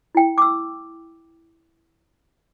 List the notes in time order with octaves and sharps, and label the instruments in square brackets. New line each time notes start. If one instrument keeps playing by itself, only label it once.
[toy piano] E4 G5
D6 E6